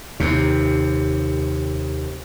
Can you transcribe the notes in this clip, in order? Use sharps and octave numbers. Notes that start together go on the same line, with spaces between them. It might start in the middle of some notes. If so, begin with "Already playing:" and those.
D#2 C3